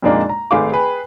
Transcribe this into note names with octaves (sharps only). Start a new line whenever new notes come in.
F2 A#2 G#3 A#3 D4 D#4
A#5
G#1 A3 G#4 B4 F5 D6
G#4 B4 G5